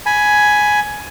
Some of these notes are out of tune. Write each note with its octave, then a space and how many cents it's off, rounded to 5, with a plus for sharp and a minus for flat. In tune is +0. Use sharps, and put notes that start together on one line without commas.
G#5 +10 B5 +0